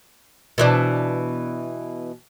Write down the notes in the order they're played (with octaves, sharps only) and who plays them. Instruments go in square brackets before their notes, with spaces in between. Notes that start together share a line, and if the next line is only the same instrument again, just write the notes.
[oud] B2 E3 D4